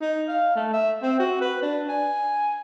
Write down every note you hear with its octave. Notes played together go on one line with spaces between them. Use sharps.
D#4
F5
A3
E5
C4
F#4
B4
D4
G#5